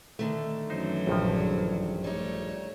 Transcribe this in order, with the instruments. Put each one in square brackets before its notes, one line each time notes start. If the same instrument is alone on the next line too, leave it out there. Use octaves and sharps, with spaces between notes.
[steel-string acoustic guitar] D3 D#3 A3
[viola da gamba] F#2 E3 F#3 [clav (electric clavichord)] D#4 C5
[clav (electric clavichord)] A#1 G2 F3
[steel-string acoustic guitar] G3 D#4 [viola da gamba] A3 C#5